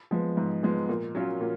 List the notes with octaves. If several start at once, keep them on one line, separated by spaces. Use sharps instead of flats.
F3 G#3 B3
G#2
F3 G#3 B3
A#2
F#3 C#4 F4
A#2